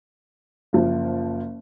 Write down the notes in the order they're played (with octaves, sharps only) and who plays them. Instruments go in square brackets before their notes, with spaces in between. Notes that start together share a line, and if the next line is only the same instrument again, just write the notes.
[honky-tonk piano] F#1 F3